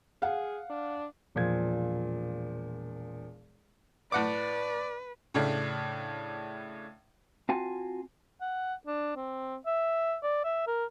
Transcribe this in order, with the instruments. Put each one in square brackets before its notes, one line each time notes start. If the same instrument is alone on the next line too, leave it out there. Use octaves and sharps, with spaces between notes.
[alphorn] G#4 [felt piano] F5 F#5
[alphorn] D4
[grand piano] E1 A#2 F3 G#6
[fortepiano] A2 F#5 D6 [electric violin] B4 [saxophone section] D5
[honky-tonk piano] A2 C#3 A3 D4
[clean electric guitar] C4 F4 F#4 F5 G#5 A5
[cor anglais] F#5
D4
C4
E5
D5
E5
A#4